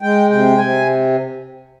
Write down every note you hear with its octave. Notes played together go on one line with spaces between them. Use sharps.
G#3 G5
C3 G5
C3 G#5